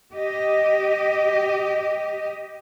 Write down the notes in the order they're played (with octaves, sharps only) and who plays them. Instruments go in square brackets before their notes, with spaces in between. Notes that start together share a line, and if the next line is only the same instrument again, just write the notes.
[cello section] G4 D#5